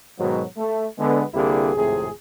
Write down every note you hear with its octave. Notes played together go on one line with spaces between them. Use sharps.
G#2 B2 D#3 F#3
A3
D3 G#3 B3
C2 D3 A#3 E4 G4 G#4
G#1 F2 A2 C3 G#4